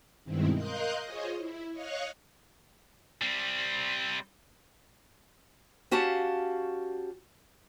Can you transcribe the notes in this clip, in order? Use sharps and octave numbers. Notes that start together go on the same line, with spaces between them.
G2 B2 D#3 G#3 C4 E4
A#4 D#5 F5 C6 F#6 G6
F4 G#4 C5 C#5 D#5
E4
C#5 D#5 F5 C#6 F6 F#6
G3 C4
C#4 F#4 G4 F5 A5